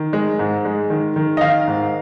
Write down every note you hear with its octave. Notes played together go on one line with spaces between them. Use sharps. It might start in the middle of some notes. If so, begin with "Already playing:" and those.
Already playing: D#3
G#3
G#2
G#3
D#3
D#3
D#5
D#3 F5
G#2